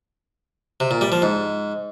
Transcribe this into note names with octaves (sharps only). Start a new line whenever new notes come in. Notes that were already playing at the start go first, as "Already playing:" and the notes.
C3
A#2
G3
F3
G#2